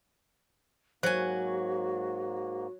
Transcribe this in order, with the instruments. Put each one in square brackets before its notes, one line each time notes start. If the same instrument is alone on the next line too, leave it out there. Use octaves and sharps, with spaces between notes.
[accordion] G#2 A#3 [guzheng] F#3 G#5 [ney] F#4 [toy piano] C5